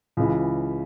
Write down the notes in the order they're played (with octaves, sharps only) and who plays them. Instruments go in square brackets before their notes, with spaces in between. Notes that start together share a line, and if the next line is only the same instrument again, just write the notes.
[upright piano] C#2 C#3 E3